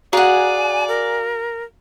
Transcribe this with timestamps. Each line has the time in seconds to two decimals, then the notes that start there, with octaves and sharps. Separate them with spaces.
0.13 F#4 G#4 D5 F5 F#5 G#5 A#5
0.88 A#4